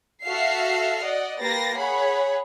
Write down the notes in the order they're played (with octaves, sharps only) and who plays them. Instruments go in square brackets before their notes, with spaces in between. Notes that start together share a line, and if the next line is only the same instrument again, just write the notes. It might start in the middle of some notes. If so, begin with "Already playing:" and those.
[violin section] F#4 A4 E5 F5 F6 C7
D5 D#5 F#5
A#3 G4 B4 A6 A#6 C7
G#4 C#5 F#5 B5